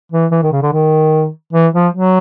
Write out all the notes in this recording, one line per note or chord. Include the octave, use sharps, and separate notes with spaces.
E3
E3
D#3
C#3
D3
D#3
E3
F3
F#3